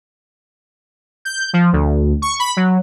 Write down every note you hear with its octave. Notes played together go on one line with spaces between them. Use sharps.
G6
F3
D2
C#6
B5
F#3